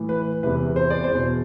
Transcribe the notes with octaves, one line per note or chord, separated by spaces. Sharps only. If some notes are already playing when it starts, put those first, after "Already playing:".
Already playing: A2 E3
B4
E2 C3 E3 B4
C5
D5
C5
E2 B2